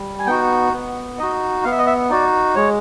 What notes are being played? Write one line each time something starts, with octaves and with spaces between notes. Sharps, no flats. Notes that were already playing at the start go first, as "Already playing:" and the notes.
Already playing: G3
G#5
B3 D#4 F#4 G5
B3
D#4 F#4 D#5
B3 F5
E5
D#5
E5
D#4 F#4 D5
G#3 C#5